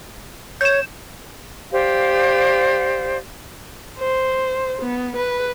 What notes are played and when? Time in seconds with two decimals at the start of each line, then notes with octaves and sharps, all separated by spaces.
0.61 C#5 G6 E7
1.72 G4 C5 D5 F5
3.99 C5
4.82 B3
5.17 B4